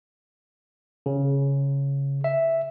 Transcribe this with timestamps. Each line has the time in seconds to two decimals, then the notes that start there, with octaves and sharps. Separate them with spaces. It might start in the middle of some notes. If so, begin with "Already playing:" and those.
1.06 C#3
2.24 E5